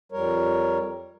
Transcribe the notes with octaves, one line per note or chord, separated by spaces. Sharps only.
F2 G3 A#4 C#5